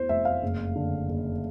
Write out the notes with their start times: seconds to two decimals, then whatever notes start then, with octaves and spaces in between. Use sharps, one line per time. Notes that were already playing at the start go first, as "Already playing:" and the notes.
Already playing: E2 E3 C5
0.09 F1 E5
0.25 F5
0.43 F#1
0.75 D3
1.09 F#1